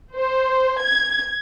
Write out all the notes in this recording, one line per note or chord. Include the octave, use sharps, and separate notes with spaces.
C5
G#6